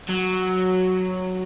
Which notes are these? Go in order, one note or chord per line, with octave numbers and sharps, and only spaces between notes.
F#3